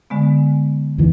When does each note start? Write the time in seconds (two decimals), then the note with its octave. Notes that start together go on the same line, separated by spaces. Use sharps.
0.10 D3 G#3 B3
0.98 E2 D#3 E3